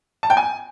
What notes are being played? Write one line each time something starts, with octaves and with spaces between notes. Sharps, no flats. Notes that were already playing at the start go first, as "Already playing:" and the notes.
A5
G5
G#5